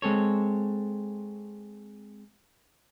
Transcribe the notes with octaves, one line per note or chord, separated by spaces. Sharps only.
G#3 C4 A4 C#5